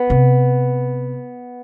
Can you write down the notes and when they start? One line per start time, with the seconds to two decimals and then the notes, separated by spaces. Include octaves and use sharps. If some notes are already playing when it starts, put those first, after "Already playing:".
Already playing: B3
0.10 C3